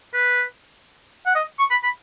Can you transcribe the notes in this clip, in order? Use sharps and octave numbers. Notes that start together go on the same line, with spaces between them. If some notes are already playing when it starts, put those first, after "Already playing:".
B4
F#5
D#5
C#6
B5
B5